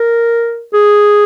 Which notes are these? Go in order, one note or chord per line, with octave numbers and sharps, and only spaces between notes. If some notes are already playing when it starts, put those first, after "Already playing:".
Already playing: A#4
G#4